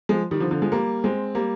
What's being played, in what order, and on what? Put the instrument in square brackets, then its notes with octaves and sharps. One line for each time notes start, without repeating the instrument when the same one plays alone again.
[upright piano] F3 G#3
D#3 G3
D3 F3
D3 F3
F3 G#3
G3 A#3
G#3 C4
G3 A#3